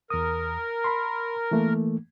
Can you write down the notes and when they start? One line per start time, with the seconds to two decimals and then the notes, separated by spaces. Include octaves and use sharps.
0.10 E2 A#4 D#6
0.84 B5 C6
1.51 E3 A3 A#3